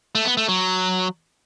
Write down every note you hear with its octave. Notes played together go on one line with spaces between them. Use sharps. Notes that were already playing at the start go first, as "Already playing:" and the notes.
A3
B3
A3
F#3